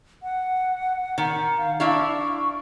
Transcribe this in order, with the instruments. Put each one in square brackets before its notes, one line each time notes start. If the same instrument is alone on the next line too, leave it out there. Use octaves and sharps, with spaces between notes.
[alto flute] F#5
[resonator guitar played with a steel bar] D#3
[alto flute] F5
[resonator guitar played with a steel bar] D4 E4 F5 [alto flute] C#6